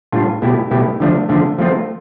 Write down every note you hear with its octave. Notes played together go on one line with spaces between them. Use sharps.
A2 G3 D4 F4
B2 A3 E4 G4
B2 A3 E4 G4
D3 F3 A3 D4
D3 F3 A3 D4
F3 A3 C4 F4